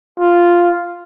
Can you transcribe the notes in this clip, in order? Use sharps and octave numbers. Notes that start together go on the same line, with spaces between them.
F4